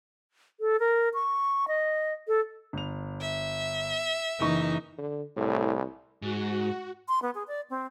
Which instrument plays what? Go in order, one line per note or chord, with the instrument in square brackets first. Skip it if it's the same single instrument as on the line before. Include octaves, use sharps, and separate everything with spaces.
[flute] A4
A#4
C#6
D#5
A4
[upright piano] G1 F7
[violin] E5
[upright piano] F#1 C#6 [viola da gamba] E3 D#4
[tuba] D3
[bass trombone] C2 [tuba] A2
[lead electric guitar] G#2 [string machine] F#4
[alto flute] C6
B3
G#4
D5
C4